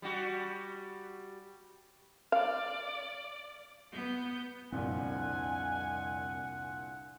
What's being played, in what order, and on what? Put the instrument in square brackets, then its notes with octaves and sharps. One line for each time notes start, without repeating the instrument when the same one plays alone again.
[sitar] G3 F#4
[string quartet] D5 [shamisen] F5
[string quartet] B3 G6
[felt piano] C2 A#2 D3 [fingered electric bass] F2 C4 [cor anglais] F#5 [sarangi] G#5